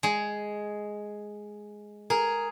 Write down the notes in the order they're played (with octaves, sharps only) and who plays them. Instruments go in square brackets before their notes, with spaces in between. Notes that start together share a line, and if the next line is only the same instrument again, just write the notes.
[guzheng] G#3 G#4
[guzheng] G#4 [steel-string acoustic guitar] A#4